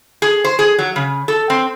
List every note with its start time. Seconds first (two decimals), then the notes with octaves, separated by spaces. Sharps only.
0.22 G#4
0.44 C5
0.59 G#4
0.79 F#3
0.96 C#3
1.28 A4
1.50 C4